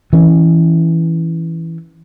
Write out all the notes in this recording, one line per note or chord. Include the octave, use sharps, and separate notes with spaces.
E3 C#4